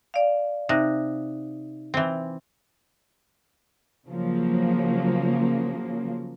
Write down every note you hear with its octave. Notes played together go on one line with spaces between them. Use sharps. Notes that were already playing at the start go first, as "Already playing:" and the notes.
D5 F5
C3 D#4 F#6 A#6
E3 C4
C#3 F3 F#3 A#3